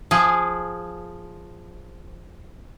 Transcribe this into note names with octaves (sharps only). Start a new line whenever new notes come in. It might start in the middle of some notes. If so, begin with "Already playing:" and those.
F3 G#4